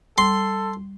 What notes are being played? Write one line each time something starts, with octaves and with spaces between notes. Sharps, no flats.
G3 A4 C6